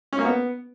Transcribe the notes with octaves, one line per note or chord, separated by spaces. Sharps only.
C#4
A#3
B3